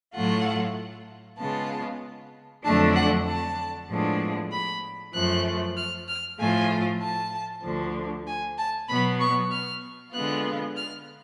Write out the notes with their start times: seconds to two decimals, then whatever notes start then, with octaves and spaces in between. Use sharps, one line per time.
0.14 A2 F#3 A3 F4 F#5
1.39 C#3 G#3 B3 F4 A5
2.64 F2 D3 F#3 A3 D4 A5
2.95 F#5
3.27 A5
3.89 A2 F3 G#3 B3 D4
4.52 B5
5.14 F#2 F3 A3 F#6
5.76 F6
6.08 F6
6.39 A2 F3 A3 F4 G#5
7.01 A5
7.64 D2 D3 F3
8.26 G#5
8.58 A5
8.89 B2 F#3 B3 B5
9.20 C#6
9.51 F6
10.14 D3 G#3 B3 F4 F#6
10.77 F6